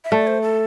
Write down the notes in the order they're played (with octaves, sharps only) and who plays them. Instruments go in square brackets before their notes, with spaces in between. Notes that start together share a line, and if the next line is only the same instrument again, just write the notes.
[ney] E5
[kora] A3 [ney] D5
[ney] C5
A4